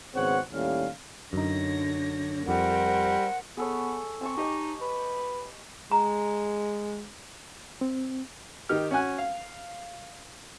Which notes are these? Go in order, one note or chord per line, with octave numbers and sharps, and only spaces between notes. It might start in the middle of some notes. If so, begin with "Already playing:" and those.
G#1 C#3 B3 C4 C#5 F#5
D#2 A2 G3 C#4 F5
F#2 D3 D#4 C#5 A#6
F2 G3 A#4 C5 F#5
B3 G#4 A4 C#5
C4 G#5 A5 C#6
D#4 G4 D#5 A5
B4
G#3 A#5
C4
D#3 D#4 G4 F6
C#4 F#4 F#5 G#5 F#6
F5